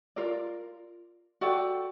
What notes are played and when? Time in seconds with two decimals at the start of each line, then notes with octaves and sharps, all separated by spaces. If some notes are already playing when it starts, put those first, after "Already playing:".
0.16 F4 A#4 D5
1.41 F#4 A4 D5 G5